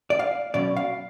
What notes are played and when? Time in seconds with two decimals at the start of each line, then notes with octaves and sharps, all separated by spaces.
0.10 D5
0.19 F5
0.54 B2 F#3 C#4 D5
0.77 F5